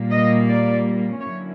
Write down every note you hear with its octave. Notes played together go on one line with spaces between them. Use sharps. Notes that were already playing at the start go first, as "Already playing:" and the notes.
Already playing: A#2 G3 A#3
D#5
D5
D3 F#3 A#3 C#4 E4 C#5